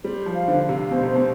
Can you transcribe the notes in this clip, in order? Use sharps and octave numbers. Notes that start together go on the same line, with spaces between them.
G3 C5
F3
F5
D3
F5
C3
B2 C5
C3
B2 C5